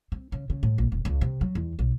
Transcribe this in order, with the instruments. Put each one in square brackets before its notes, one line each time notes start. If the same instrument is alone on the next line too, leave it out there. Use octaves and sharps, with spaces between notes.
[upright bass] C4
C#3
C#3
A2
A#1
E1
C#2
C3
F#3
E2
B1